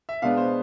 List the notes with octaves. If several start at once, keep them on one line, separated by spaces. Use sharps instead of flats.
E5
B2 G#3 B3 D4 F5
C5